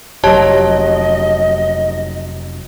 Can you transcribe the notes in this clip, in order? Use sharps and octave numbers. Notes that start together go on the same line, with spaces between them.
F1 F#3 G4 C#5 D#5 A5